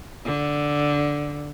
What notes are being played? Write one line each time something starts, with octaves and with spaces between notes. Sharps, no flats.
D3